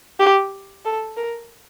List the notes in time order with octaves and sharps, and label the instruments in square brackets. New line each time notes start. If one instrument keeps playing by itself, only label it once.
[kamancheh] G4
A4
A#4